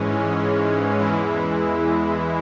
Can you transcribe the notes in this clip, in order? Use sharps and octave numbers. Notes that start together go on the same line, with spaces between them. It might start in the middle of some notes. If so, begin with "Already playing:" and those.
Already playing: G#2 E3 G#3 C#4
E2 E3 G#3 E4